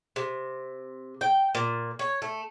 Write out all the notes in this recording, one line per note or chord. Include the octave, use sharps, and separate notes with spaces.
C3
G5
A#2
C#5
A3